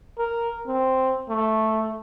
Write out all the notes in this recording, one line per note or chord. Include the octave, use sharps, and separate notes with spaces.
A#4
C4
A3